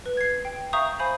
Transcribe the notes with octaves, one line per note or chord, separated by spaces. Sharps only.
B4
G#6 C7
G5
E5 F5 A#5 C#6 D#6 G6
C5 F5 G#5 B5 G6